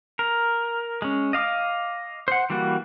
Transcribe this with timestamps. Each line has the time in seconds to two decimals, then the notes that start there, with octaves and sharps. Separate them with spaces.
0.19 A#4
1.02 G#3 C#4
1.33 D#5 F5 D6
2.28 C5 F#5
2.50 E3 G3 A#3 F#4